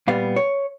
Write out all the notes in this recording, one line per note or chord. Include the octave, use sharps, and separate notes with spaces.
A#2 G3 B3 F5
C#5